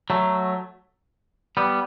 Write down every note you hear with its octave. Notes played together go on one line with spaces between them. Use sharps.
F#3 A3
G3 B3